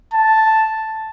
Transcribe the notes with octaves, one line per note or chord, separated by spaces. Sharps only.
A5